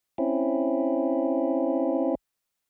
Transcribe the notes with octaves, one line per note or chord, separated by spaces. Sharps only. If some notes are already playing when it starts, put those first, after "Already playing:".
C4 C#4 E4